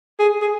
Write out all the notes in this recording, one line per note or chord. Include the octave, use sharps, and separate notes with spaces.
G#4
G#4